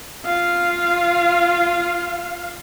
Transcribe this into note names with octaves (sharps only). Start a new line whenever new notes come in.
F4 F5